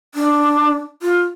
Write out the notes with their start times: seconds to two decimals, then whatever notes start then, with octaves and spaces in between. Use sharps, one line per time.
0.15 D4
1.02 F4